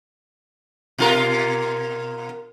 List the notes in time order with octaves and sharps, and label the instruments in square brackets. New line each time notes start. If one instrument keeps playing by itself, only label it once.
[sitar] B2 F4 A#4